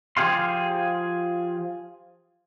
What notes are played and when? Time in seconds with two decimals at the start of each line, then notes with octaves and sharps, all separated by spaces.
0.17 F3 F4 G4 G#4 F5 C6